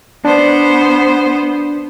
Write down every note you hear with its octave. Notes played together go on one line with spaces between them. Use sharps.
B3 D4 C5